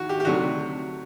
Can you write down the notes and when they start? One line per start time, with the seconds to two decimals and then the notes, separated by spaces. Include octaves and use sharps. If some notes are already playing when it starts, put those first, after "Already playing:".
Already playing: D#2 D#3 F#4
0.09 G4
0.20 G4
0.25 D2 C3 D#3 F#3 A3 F#4